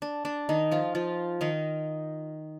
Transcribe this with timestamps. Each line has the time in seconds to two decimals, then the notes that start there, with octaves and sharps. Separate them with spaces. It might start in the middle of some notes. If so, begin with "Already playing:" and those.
0.02 D4
0.25 D4
0.49 D#3 D#4
0.71 F3 F4
0.95 F3 F4
1.41 D#3 D#4